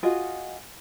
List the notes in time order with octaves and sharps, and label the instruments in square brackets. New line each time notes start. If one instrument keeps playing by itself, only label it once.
[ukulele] F4 F#4 G#4 D#5